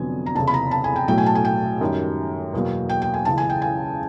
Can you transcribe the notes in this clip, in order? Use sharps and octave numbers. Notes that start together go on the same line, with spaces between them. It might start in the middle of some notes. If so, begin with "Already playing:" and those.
Already playing: F1 F2 D3 F#3 B3 G#5
A#5
F1 E2 C#3 A5
B5
A#5
A5
G#5
G5
B1 A2 F#3 A3 G5
G#5
A5
G#5
G5
F#2 D#3 G3
E2 B2 F#3 A#3
G5
G5
G#5
C#2 C#3 E3 A5
G#5
G5
G#5